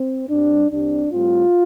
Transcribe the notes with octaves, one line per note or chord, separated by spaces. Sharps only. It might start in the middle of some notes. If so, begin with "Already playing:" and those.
Already playing: C4
G2 G3 C4 D4
C2 C3 G3 C4 D4
A2 G3 C4 F4